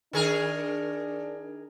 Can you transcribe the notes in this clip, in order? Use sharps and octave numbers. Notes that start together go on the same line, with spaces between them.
D#3 D4 G#4 A#4